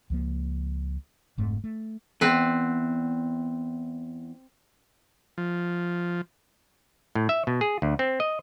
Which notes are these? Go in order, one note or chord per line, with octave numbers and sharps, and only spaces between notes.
C#2 F3 A#3
F1 G#2 A3 C4
A3
E2 C4 B4
F3
A2
E5
B2
G#4
D2
C4
D#5